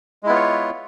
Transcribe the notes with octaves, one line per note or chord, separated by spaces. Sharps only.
G#3 B3 E4 F4 C#5